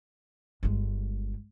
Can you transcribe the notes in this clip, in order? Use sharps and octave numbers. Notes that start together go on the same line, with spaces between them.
G1 G#3